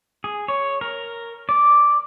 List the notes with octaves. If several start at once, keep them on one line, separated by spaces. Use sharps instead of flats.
G#4
C#5
A#4
D5